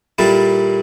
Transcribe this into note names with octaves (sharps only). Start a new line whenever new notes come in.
A#2 G3 A#3 E4 A4